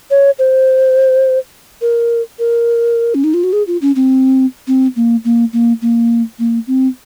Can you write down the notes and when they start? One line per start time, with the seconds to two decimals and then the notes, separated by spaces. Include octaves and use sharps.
0.11 C#5
0.39 C5
1.81 A#4
2.39 A#4
3.15 C#4
3.24 D#4
3.34 F4
3.44 F#4
3.53 G#4
3.67 F4
3.82 C#4
3.96 C4
4.67 C4
4.96 A#3
5.25 A#3
5.53 A#3
5.82 A#3
6.39 A#3
6.67 C4